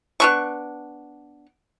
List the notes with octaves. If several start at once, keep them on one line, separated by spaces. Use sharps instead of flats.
B3 D4 C#6